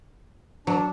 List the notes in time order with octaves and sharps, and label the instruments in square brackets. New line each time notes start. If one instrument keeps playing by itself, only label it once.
[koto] F#3 [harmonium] D4